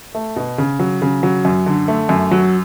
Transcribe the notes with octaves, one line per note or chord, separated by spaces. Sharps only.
A3
B2
C#3
F#3
C#3
F#3
F#2
D3
A3
F#2
F#3